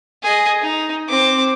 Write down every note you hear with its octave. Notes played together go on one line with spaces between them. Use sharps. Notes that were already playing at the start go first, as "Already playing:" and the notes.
G#4 D#5
D#4
C4 D6